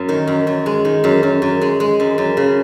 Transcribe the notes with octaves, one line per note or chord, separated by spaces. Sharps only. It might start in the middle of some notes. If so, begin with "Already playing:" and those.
Already playing: F#2
D#3
F#2
F#2
G#3
D#3
F#2
F#2
F#2
G#3
G#3
F#2
F#2
C#3